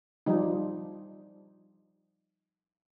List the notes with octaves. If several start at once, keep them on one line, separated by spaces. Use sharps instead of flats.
F3 G3 D#4